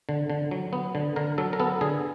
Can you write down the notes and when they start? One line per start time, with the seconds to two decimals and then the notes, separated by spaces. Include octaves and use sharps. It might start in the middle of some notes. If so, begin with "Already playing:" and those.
0.09 D3
0.30 D3
0.51 F#3
0.73 B3
0.95 D3
1.16 D3 A#4
1.38 F#3 A4
1.53 A#4
1.60 B3 A4
1.81 D3 G#4